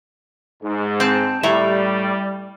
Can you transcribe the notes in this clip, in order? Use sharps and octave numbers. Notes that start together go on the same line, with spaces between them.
G#2
C4 A5
A2 G3 E5 A#5